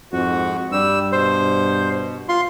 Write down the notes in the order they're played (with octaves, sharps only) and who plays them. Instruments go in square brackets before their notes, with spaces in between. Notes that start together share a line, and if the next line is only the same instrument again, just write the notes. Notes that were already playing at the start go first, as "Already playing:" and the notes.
[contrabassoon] F2 [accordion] G#2 F#4
[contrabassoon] G2 [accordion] G3 E6
[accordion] B2 [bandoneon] C5
[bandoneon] F4 C6